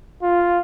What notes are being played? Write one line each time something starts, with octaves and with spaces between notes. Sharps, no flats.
F4